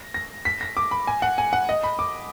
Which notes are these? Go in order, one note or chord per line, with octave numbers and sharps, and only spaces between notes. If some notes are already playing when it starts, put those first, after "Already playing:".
Already playing: A#6
A#6
B6
A#6
D6
B5
G#5
F#5
G#5
F#5
D#5
B5
D6